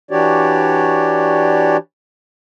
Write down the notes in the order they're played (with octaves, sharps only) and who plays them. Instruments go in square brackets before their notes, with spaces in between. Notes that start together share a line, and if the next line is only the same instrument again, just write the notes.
[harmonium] E3 D4 F#4 G4 C#5 D5